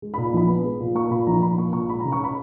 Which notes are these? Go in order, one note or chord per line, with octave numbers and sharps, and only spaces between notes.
G#3
A#2 B5
A#1 B5
B3
G#3
A#2
A#3 C#6
A#2 B5
A#1 A#5
A#1 B5
A#3 C#6
A#2 C#6
G#3 B5
C#3 A#5
C#6
B5